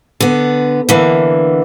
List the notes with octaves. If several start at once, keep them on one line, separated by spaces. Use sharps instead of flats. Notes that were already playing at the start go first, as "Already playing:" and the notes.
D3 B3
D3 E3 A#3